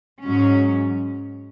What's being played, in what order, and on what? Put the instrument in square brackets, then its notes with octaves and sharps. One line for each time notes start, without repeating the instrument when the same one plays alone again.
[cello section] G#2 F#3 C#4